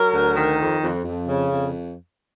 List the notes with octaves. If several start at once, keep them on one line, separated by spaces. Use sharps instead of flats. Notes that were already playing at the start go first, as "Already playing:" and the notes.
Already playing: F#3 A#4
D2
D#3
F2
F2
F2
C#3
F2